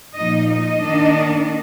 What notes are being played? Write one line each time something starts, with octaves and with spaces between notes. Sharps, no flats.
A#2 F3 A#3 D#4 D#5
D#5
D#3 A#3 D4